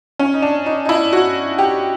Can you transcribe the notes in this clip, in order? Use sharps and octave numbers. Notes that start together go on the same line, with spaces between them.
C#4
D#4
D4
D#4
D#4
E4
F#4
G4